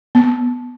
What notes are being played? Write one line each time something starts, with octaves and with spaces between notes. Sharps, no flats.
B3